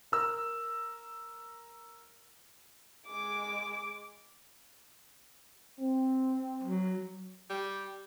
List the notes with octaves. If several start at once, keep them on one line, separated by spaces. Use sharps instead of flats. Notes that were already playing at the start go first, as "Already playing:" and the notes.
A#4 E6
G#3 D6
C4
F#3
G3